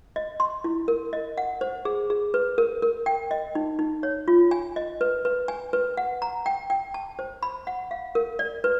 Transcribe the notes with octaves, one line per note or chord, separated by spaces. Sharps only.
D#5
C6
E4
A#4
D#5
F#5
C5
G#4
G#4
B4
A#4
A#4
G5
D#5
D#4
D#4
C#5
F4
G#5
D#5
B4
B4
G#5
B4
F#5
A#5
G5
G5
A5
C5
B5
F#5
F5
A#4
D5
B4